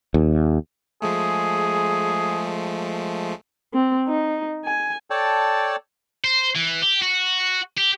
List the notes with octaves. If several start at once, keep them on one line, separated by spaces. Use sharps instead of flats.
D#2
F3 G#3 A3 G#4
C4
D#4
G#5
A4 C#5 D5 G5 A5
C5
E3
G4
F#4
G4